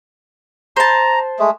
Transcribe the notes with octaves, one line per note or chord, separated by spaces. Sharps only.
C5 A5 A#5
G#3 A3